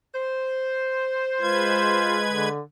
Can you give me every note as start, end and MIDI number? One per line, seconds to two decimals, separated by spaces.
0.15 2.28 72
1.41 2.49 56
1.41 2.22 65
1.41 2.49 71
1.41 2.49 92
2.30 2.60 50